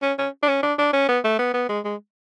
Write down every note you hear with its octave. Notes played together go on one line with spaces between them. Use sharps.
C#4
C#4
D4
C#4
D4
D4
C#4
B3
A3
B3
B3
G#3
G#3